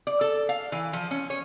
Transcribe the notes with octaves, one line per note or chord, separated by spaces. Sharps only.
D5
A4
F5
E3
F3
C#4
C#5